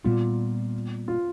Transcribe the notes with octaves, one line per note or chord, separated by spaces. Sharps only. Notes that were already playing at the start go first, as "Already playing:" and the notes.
A#2 G3 B3 F4
F4